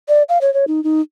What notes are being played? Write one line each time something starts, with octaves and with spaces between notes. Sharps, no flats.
D5
F5
C#5
C#5
D#4
D#4